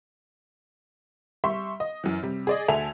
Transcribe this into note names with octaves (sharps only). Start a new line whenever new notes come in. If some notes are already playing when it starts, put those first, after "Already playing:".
G3 E5 C6 C#6
D#5
F#2 E3
C3 G3
G#4 D5 D#5
D2 A4 E5 G#5 F7